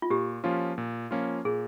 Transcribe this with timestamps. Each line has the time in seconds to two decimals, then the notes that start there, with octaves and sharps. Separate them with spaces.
0.02 F4
0.10 A#2 G4
0.44 F3 A#3 C#4 F4
0.78 A#2
1.11 F3 A#3 C#4 F4
1.45 A#2 G#4